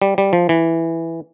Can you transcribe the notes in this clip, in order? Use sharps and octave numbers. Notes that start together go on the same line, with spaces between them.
G3
G3
F3
E3